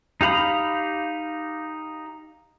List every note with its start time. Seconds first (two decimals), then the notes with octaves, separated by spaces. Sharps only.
0.21 D#4 G4 F5 B5 D#6